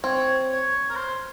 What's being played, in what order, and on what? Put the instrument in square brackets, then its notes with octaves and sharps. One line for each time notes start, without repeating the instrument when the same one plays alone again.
[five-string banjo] C4 [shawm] C#5
[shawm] C#5
A#4
C5